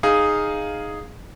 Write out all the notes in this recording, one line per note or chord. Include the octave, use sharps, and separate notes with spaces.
D#4 G#4 F5